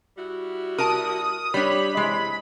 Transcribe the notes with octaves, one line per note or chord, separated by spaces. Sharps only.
G3 E4 F#4
A#4 A5 D#6
G3 D4 C#5 B5
C3 E3 G#3